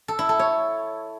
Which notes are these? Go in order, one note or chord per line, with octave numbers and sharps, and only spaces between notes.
A4
E4
A4
C#5